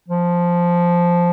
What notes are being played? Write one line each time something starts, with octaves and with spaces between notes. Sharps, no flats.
F3